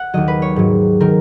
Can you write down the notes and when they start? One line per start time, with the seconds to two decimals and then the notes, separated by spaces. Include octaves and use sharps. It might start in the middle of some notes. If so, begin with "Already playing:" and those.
Already playing: F#5
0.13 D#2 D#3 F#3 D#5
0.28 B4
0.42 C#5
0.56 G#2 F#3
1.00 D#3 F#3 A#4